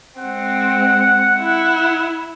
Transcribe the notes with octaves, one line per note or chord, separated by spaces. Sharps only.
G#3 C4 F#5
E4